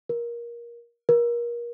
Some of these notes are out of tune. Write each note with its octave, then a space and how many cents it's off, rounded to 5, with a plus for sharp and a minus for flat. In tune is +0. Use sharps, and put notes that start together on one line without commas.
A#4 +20
A#4 +30